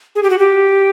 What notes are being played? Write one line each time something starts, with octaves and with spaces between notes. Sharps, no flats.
G#4
G4
F#4
G4